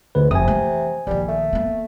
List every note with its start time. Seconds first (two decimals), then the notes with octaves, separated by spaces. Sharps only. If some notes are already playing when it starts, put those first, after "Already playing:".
0.15 D2 G#2 D3 B4
0.31 F1 C3 G#5 D#6
0.48 E3 A3
1.07 A#1 D#3 G3
1.28 A3
1.53 A#3 B3